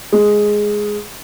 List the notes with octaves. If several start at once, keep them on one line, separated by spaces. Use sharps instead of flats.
G#3